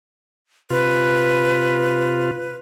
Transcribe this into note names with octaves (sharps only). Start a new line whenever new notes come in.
C3 F4 B4